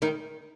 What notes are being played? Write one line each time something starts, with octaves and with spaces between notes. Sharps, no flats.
D#3 D#4